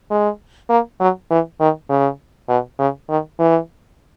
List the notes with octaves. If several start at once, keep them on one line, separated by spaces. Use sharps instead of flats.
G#3
A#3
F#3
E3
D#3
C#3
B2
C#3
D#3
E3